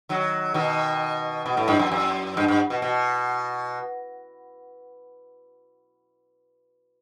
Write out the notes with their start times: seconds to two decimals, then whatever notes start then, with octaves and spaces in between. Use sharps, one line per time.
0.09 D#3 F#3
0.54 B2 D#3
1.46 B2
1.57 A2
1.68 G2
1.79 F#2
1.92 F#2
2.37 G2
2.48 G2
2.70 B2
2.82 B2